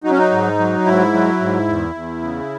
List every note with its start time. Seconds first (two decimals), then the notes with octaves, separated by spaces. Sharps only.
0.04 F#3 D#4
0.11 C#4
0.18 D#4
0.31 G#2
0.59 F#3
0.86 G#2 E4
1.14 F#3
1.40 G#2
1.68 E2
1.95 E2
2.22 C#3